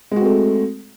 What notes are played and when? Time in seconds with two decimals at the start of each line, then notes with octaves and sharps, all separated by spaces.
0.12 G#3
0.16 F#4
0.21 C4
0.25 A3